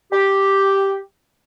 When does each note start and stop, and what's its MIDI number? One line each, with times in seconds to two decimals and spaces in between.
0.11 0.97 67